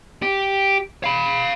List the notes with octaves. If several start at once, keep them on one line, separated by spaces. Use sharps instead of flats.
G4
F5 B5